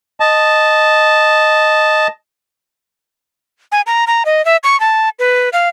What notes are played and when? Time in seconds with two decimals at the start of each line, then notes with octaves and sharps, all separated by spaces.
0.20 D#5 A5
3.72 G#5
3.87 A#5
4.07 A#5
4.25 D#5
4.45 E5
4.64 C#6
4.80 A5
5.19 B4
5.53 F5